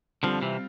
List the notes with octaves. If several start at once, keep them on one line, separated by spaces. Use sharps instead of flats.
D3 F3 G3 C4 F4
C3 E3